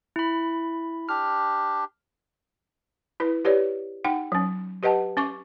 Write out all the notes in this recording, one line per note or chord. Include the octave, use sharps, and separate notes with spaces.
E4 B5
D4 G4 F6
E4 B4
G4 B4 C#5 D5
D#4 F#5 G5
F#3 C#4
G4 B4 D#5 F#5 A5
C#4 C#6 D6